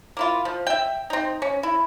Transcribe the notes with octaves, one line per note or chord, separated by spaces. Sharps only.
A#3 E4 F4
F3
E5 G5
C4 D#4
C#4
E4